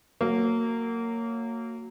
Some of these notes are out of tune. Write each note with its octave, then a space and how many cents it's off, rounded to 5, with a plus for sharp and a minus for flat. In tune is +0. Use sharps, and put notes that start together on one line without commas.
F#3 +0 A#3 -20